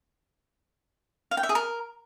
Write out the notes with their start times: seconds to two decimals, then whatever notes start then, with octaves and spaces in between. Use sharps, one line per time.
1.31 F5
1.37 G5
1.43 E5
1.49 G#4
1.55 A#4